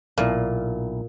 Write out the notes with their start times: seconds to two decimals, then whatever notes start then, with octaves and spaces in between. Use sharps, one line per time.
0.18 B1 A#2 E4 F5